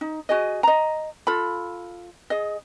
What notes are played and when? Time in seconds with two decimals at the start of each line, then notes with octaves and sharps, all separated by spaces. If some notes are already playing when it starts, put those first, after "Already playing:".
0.01 D#4
0.29 F#4 G#4 D#5
0.63 D#5 A#5
1.27 F4 A4 B5
2.30 G#4 D#5